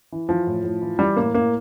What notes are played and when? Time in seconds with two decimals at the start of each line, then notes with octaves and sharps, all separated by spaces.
0.12 E3
0.29 E3 F3
0.47 A2
0.63 A2
0.82 E3
0.99 E3 G3
1.17 A2 A#3
1.34 A2 A#3